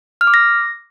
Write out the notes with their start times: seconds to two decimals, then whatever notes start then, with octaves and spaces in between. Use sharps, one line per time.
0.21 F6
0.27 D6
0.34 A#6